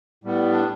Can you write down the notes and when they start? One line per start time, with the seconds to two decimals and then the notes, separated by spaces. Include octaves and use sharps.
0.24 A2 G3 B3
0.52 D4